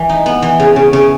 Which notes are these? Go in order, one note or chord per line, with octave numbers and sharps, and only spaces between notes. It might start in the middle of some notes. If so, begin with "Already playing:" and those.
Already playing: E3
D#4
B3
E3
C#3
C#3
C#3